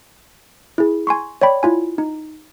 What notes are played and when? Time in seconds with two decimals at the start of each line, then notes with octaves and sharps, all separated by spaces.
0.78 E4 G#4
1.07 G#5 C6 C#6
1.42 C#5 D5 G5 B5
1.63 E4 F4 G#5
1.98 D#4